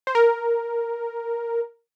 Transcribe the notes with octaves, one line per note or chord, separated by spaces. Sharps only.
C5
A#4